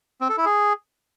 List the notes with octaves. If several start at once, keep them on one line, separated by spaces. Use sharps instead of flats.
C4
A4
E4
G#4